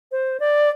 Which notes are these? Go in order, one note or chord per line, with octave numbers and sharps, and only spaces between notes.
C5
D5